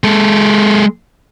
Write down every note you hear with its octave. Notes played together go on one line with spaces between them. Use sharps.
G#3 A4